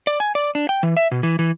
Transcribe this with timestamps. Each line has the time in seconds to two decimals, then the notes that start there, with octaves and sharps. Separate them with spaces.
0.07 D5
0.20 G#5
0.35 D5
0.55 D4
0.69 G5
0.83 E3
0.97 E5
1.11 B2
1.23 E3
1.39 E3